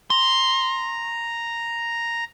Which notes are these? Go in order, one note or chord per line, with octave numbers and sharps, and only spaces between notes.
A#5 C6